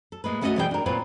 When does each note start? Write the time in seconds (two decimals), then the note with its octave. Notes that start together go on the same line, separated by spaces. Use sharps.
0.12 A4
0.24 A2 G#3 A#3 B4
0.41 G#2 A3 C#4 F#4 G4 D#5
0.56 B2 E3 G3 G#4 C5 G5
0.71 D4 A#4
0.86 A#2 C4 F4 B4 C#5